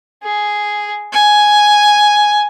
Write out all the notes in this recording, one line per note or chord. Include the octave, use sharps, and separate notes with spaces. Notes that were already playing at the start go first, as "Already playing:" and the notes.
G#4
G#5